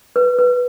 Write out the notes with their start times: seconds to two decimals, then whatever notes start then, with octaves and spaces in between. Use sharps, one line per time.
0.16 B4
0.39 B4